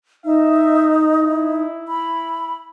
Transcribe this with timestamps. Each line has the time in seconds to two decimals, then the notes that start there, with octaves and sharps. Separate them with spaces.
0.25 D#4 E5
1.20 E4
1.88 B5